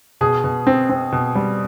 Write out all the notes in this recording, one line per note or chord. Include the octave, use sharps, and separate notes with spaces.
B2 G#4
B2
C4
C4
B2
G3